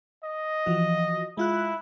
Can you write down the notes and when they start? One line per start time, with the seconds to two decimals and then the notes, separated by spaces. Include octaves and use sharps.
0.23 D#5
0.66 E3 F3 F#4
1.37 G#3 E4 F4 F#6